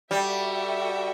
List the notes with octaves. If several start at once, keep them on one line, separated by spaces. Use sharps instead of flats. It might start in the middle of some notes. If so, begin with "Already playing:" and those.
G3 F#4 A4 E5 G5